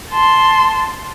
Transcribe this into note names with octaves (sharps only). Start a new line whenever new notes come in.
A5 C6